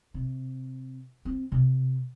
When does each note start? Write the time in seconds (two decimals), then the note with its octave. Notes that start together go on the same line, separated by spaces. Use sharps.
0.14 C3
1.25 C4
1.52 C3